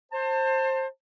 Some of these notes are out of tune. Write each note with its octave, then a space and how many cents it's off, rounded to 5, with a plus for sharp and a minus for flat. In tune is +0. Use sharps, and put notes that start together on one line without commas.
C5 +20 A5 +30